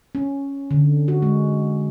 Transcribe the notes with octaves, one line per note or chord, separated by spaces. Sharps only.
C#4
D3
F#4
G#3